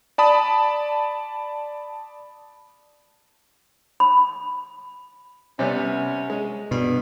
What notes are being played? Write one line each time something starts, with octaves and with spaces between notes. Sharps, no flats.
D5 A5 B5 D#6
B5
C3 G3 B3 C#4
G#3
G2 B2